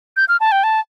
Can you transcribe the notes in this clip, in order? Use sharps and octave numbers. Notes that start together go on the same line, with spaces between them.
G6
F6
A5
G5
A5